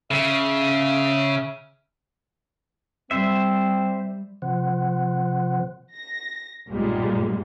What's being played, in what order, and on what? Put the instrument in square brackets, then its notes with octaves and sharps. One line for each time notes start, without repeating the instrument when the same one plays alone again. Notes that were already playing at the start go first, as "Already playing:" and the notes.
[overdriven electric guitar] C#3 [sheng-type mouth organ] E5
[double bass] G3 [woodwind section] C4 [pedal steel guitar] C5 E5
[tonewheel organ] C3 F3 C5 F#5
[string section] A#6
B1 G2 A#2 G3 G#3 A#3